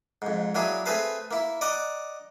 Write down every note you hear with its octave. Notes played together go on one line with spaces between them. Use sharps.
F2 G#2
F#3 A#3 D4 E4 G#4
A3 C4 G#4 B4 F5 A5
A#3 E4
D5 D#5 F#5 A#5